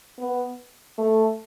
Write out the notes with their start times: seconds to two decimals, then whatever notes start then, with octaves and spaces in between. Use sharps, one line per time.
0.18 B3
0.98 A3